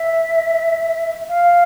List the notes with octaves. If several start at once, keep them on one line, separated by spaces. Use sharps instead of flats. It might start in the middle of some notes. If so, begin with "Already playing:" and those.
Already playing: E5
F5